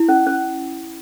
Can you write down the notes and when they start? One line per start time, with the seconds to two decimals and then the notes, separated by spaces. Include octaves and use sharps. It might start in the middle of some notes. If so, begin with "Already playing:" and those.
Already playing: E4
0.09 C#4
0.27 C#4